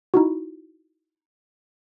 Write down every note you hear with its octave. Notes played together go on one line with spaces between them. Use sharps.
D#4 E4 F#4